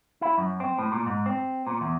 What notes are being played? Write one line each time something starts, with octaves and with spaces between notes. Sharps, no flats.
E4
F#2
C4
A2
A#2
G#2
C4
A#2
E2